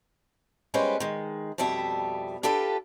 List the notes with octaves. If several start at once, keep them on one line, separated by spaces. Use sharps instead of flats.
G3 G#3 C#4 F4 B4 C5
D#3 G#3
F2 B2 G3 E5 A5
D4 F4 G4 A4 B4